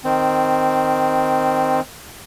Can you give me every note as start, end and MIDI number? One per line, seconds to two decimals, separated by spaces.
0.05 1.80 51
0.05 1.80 60